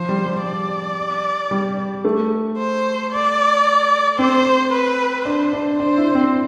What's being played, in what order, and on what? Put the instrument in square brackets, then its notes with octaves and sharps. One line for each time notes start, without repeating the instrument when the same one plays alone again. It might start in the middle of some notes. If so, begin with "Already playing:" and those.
Already playing: [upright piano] F3 [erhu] C5
[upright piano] G3
G3
[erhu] D5
[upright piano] G3
A3
[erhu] C5
D5
[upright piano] C4 [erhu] C5
[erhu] B4
[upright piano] D4 [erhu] C5
[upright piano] D4
[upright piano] D4 [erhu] C5
[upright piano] E4
C4